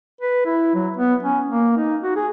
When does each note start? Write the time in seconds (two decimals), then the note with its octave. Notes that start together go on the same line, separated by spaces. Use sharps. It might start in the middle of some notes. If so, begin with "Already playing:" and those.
0.21 B4
0.46 E4
0.74 F#3
0.97 B3
1.23 C#4
1.47 A#3
1.77 D#4
2.03 F#4
2.16 G#4